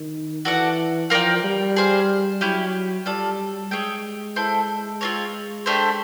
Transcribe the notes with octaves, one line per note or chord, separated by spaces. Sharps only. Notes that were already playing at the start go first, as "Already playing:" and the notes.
Already playing: D#3
E3 F#4 A4 D5 F#5
F3 F4 A#4 D5 G5
G3
G#4 C5 F5
F#3 C#4 E4 G4
G3 F4 A4 D5
G#3 G#4 C#5 E5 G5
E4 A4 C5
C4 F4 A#4 C#5
A3 D4 G4 C5